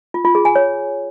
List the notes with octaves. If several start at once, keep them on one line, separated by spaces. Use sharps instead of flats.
F4
F4
G#4
G#5
C#5